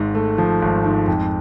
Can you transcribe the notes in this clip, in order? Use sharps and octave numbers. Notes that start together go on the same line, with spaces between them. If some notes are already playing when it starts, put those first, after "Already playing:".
Already playing: G#1 G#2
A3
F3
G#1
G#2
F2